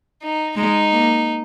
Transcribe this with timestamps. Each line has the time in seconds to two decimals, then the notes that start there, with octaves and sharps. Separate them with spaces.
0.22 D#4
0.56 G#3 D#4
0.92 A#3